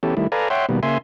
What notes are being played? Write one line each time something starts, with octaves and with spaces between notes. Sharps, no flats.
E3 B3 C#4 G4 A4
D#3 G3 A3 E4
A4 B4 D5 F5 G#5 A#5
C#5 E5 F#5 G5 C6
B2 D#3 G3 A#3 B3
C#3 A#3 E5 G#5 C6